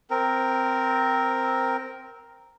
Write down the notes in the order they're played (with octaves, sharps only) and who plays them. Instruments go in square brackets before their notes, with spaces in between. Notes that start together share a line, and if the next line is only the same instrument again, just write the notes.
[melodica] C4 A#4